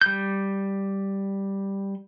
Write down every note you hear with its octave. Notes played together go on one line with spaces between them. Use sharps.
G3 G6